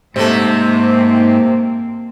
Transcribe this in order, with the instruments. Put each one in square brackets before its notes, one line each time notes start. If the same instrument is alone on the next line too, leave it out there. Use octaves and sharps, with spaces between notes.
[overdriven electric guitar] G#2 [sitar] C3 A3 [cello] A#3 C4